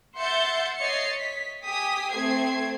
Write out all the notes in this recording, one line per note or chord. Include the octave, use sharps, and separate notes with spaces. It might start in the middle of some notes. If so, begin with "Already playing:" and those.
E5 F#5 C6 G6 A6 C#7
C#5 D#5 A6 C7 C#7
B6
G4 G#5 D#6 B6
A3 C4 C5 G#6 C7